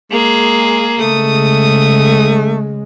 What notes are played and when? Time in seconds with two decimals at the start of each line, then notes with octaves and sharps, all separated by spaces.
0.11 G#3 A#3 G#4
1.00 C#3 G#3 A3 D#6